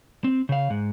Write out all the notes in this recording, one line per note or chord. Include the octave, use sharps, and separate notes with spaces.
C4
C#3 F5
G#2